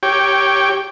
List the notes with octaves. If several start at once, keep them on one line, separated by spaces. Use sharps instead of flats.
G4 C#5 G5